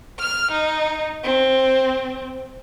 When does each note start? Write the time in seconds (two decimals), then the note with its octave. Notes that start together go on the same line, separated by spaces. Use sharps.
0.19 F6
0.52 D#4
1.23 C4